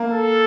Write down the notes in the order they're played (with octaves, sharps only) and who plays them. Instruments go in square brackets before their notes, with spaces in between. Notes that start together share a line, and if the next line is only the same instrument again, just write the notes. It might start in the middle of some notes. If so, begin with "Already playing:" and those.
Already playing: [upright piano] A#3
[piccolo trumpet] A4